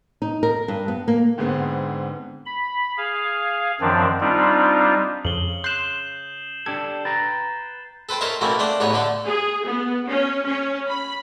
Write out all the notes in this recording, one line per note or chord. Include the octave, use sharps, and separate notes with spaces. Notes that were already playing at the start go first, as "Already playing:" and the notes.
D#4
A#4
G2
B3
A#3
G#2 D3 G#3 B3 C4
B5
G#4 F5
F#2 D#3 F3 C4 D4
G3 C4 D4 D#4 F4
F2 C#3 F#7 G7
C6 F#6 G6 C7 E7
D4 G4 A4 G#6
B4 G5 A#5 A6
A4 B4 C5 G5 A5
D#4 A4 A#4 C5 C#5 E5
B2 E3 A3 A#3 C4 C#4
A3 D4 C5 G5
A1 E2 B3 D#4 C#5
D3 A3 A4
G#4
B3
C#4
C#4
B5